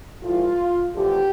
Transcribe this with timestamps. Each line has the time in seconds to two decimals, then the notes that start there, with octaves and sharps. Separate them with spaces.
0.23 A2 E3 G3 F4
0.95 E2 D3 F3 A3 G4